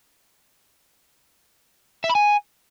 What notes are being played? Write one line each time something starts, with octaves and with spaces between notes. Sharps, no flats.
E5
B5
G#5